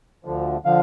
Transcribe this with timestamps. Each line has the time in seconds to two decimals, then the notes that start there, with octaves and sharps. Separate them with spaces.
0.25 D2 D3 F3
0.65 D3 F3 F5